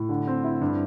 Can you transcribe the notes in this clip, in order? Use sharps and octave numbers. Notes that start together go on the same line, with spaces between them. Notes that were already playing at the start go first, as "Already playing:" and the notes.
Already playing: A2
D3
C4
E4
G2